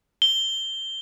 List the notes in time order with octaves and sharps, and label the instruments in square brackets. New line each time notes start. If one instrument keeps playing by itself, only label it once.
[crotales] G7